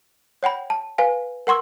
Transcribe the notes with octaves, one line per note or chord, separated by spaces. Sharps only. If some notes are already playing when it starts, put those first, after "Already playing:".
C#5 F#5 G5 B5
A5
B4 F5 G#5
A#4 F#5 C6 C#6 E6